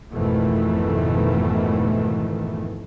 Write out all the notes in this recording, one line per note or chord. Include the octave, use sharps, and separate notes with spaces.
G#1 F2 B2 D#3 E3 A3